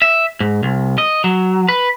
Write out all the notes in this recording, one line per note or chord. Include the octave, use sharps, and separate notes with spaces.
E5
G#2
C2
D#5
F#3
B4